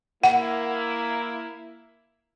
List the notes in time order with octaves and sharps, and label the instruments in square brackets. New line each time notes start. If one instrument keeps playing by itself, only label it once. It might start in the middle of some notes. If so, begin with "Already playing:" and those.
[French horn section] A#3 E4 [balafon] F#5